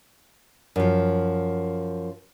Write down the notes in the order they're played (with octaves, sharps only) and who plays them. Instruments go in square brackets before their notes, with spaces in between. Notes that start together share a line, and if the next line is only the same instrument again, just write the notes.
[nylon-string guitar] F#2 F3